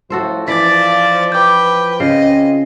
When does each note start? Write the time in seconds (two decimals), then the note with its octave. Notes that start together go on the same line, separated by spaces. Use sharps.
0.10 A2 F3 F#4 A4 C5
0.48 E3 F3 D5 A6 B6
1.32 F3 B4 G5 D6 G6
2.00 C#3 C4 F4 G#4 D#5 C7